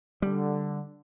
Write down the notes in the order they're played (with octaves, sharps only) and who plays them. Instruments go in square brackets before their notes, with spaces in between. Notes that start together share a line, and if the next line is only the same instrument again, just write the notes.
[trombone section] D3 [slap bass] G3